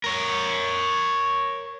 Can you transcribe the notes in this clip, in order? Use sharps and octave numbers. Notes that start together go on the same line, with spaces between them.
A#4 C#5